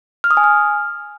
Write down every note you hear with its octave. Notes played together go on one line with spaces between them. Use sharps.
F6
D#6
G#5
F6